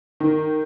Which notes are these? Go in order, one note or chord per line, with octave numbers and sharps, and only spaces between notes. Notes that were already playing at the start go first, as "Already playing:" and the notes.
D#3